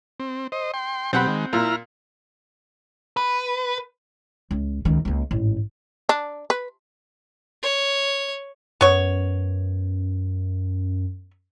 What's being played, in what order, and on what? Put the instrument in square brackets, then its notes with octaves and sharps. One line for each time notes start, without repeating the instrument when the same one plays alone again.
[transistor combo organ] C4
C5 D#5
G5 C6
[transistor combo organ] B2 F#3 G4 [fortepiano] C4 F#5 B5
[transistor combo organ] D#3 G#3
[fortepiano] A#2 [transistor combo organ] E4 A#5 F6
[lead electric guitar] B4
[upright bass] C#2
C#2 D#3
C#2 A#3
A1 G#2
[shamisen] D4
B4
[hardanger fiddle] C#5
[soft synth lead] F#2 [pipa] B3 C#5